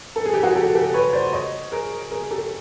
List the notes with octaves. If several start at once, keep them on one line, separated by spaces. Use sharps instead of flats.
A4
G#4
G4
F#4 G#4
G4 A4
G4 A4
B4 C#5
C5 D5
C#5 D#5
G#4 A#4
G#4 A#4
G4 A4